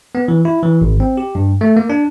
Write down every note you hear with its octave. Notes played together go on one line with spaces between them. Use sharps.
B3
E3
E4
E3
G#1
C4
G4
G2
A3
A#3
D4